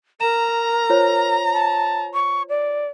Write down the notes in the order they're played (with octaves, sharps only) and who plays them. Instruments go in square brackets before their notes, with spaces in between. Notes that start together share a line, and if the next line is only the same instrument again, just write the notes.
[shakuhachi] A#4 [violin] A#5 [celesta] E7
[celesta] F4 C5 C#5
[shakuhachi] A5
C#6
D5